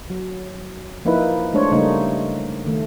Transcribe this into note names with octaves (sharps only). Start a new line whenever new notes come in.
F#3
F3 A#3 D#4 E4 B4
G#3 A3 D4 C5 C#5
C#3 G3 A3 A#3 D4 D#4
D#3 A3